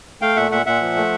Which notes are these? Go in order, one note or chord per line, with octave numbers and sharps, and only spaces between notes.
A3 F5 G5
A#2 E5 F#5
A#2 E5 F#5
A#2 E5 F#5
F3
A3